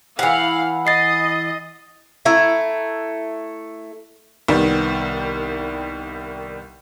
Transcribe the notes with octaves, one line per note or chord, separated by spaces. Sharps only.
E3 F5 F#5
D#5 A6 C7
A3 E4 A#5
C2 D#3 G3 B3